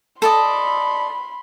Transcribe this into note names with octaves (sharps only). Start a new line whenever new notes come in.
A4 D5 D#5 B5 C6